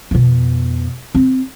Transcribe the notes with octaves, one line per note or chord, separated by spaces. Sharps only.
F2 B2
C4